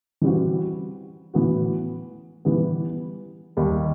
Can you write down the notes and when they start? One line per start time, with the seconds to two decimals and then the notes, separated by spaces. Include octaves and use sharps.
0.22 E3 G3 C4 F#4
1.33 A2 E3 B3 F#4
2.45 E3 G3 B3
3.57 D#2 D#3 G3